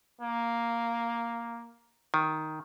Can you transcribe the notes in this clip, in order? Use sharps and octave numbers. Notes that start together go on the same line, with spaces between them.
A#3
D#3